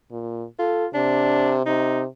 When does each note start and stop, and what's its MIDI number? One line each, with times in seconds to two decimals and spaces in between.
0.11 0.45 46
0.59 0.87 65
0.59 0.85 69
0.94 1.65 48
0.94 1.56 62
1.66 2.06 48
1.66 2.01 63